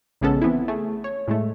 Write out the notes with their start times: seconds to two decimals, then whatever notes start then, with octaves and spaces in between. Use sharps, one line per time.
0.21 A#1 C#3 G#3 B3 C#4 A4
0.42 E3 B3 C4 E4
0.68 A3 G#4
1.04 C#5
1.28 A2 G#3 A3